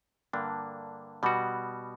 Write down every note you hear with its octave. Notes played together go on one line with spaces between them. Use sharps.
G2 D3 A#3 D4
B2 G3 B3 F#4